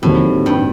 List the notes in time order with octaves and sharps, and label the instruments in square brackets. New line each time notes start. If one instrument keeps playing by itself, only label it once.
[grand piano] D#2 D#3 G3 C4 F#4 [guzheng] A2
[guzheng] G2